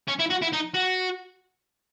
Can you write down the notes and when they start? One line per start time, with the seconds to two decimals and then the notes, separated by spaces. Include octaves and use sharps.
0.08 C#4
0.19 E4
0.30 F#4
0.42 E4
0.53 D#4
0.74 F#4